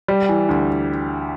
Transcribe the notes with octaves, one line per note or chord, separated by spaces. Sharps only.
G3
E3
D2